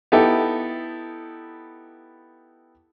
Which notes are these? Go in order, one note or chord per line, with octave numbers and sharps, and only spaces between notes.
B3 D#4 E4 G4 A4